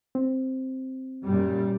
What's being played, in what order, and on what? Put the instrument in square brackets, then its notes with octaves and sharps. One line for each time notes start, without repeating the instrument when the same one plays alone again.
[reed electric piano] C4
[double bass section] F#2 A#2 G3